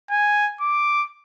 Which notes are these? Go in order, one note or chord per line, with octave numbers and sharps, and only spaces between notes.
G#5
D6